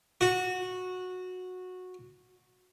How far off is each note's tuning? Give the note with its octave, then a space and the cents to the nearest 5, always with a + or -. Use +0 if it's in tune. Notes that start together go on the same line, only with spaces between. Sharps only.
F#4 -15